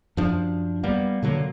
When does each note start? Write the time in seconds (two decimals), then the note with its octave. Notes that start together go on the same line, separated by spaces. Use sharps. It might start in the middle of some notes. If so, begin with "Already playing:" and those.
0.17 F#2 F3 D4
0.83 G3 A#3 B3
1.22 B2 D3 F#3 A#3